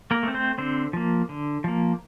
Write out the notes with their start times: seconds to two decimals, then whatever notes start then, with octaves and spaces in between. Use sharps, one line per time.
0.11 A#3 A#4
0.23 A3 C4
0.34 C4 C5
0.58 D3 C4 C5
0.93 F3 A#3
1.29 D3
1.64 F3 A#3